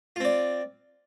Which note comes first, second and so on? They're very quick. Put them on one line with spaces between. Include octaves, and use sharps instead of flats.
F4 C4 D5